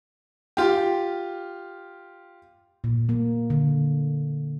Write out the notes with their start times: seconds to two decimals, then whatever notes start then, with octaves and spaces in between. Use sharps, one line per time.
0.57 F4 G4
2.84 A#2
3.09 A#3
3.50 D3